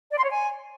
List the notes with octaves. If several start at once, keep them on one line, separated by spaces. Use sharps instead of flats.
D5
C6
C#5
G#5